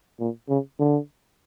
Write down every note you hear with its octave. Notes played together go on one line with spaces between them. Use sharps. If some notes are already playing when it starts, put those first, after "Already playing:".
A#2
C#3
D3